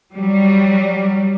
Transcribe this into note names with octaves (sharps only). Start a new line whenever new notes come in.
F#3 G3